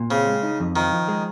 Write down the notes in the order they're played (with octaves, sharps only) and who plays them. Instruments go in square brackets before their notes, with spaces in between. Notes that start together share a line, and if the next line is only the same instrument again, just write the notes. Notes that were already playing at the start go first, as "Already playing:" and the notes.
Already playing: [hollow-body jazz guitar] A#2
[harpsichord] C#3 [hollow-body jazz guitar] C4
[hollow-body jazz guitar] G#3
D#4
F2
[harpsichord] D#3 [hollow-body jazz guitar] F3
[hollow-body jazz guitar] F3
G#3